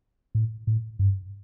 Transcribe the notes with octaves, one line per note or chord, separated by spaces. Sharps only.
A2
A2
G2